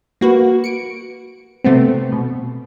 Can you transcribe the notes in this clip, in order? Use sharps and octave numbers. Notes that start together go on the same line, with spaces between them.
A#3 F#4 B4
C#7 D7
C3 A3 B3 C4
B2